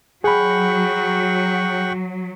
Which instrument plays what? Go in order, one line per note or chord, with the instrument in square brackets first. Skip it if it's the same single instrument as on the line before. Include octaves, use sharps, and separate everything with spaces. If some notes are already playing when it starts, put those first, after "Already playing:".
[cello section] F#3 [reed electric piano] G#4 B5 [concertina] F#5 G5 C#6